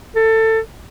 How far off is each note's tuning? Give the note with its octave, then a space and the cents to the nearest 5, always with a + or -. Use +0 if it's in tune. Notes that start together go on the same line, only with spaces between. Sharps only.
A4 +20